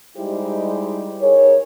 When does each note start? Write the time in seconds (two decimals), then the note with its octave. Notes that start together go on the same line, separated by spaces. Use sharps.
0.17 G3 G#3 D#4 E4 G4 C5
1.21 D#4 G#4 A#4 C#5